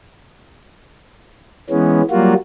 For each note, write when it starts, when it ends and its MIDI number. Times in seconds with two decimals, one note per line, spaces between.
1.70 2.02 52
1.70 2.02 56
1.70 2.02 59
1.70 2.02 61
2.11 2.34 54
2.11 2.34 55
2.11 2.34 58
2.11 2.34 65
2.11 2.34 66